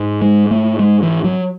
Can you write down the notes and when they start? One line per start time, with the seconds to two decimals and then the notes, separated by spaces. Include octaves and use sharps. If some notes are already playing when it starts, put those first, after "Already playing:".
Already playing: G#2
0.22 G#3
0.51 A3
0.79 G#3
1.03 E3
1.24 F#3